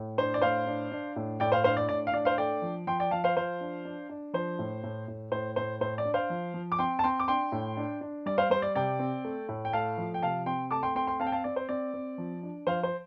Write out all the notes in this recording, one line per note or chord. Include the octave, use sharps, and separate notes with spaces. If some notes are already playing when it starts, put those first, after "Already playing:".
Already playing: A2
D4 C5
D5
A2 C5 F5
D4
D4
A2
A2 D5 G5
C5 F5
D4 C5 F5
D5
A2 D5
F5
D4 D5
C5 F5
A3 D5 G5
F3
F3 G5 C6
D5 G5
F3 F5 A5
C5 F5
F3 C5 F5
D4
D4
D4
F3 C5
A2
A2
A2
A2 C5
A2 C5
A2 C5
D5
D4
C5 F5
F3
F3
D6
C4 G5 C6
A5
C4 G5 C6
D6
D4 G5 C6
A2
D4
D4
G3 D5
C5 F5
G3 C5
D5
C3 D5 G5
C4
A3
A2
G5
A3 F5 A5
F3
G5
C3 F5 A5
C4 G5 C6
A3 A5 D6
G5 C6
C4 G5 C6
G5 C6
C4 F5 A5
G5
F5 A5
C4 D5
C5
C4 D5
C4
F3
D4
F3 C5 F5
C5